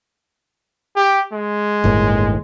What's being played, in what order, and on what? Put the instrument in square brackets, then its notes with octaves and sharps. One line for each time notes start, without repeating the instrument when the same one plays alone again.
[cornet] G4
G#3
[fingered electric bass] G1 D#2 A2